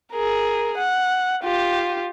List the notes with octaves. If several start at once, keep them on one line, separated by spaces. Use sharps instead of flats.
G#4 A#4
F#5
F4 G4